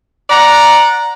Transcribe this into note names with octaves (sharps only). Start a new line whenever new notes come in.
D5 F#5 A#5